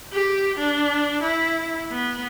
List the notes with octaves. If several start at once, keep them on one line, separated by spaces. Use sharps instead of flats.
G4
D4
E4
B3